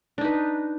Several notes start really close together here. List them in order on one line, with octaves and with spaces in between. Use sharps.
D4 D#4 B4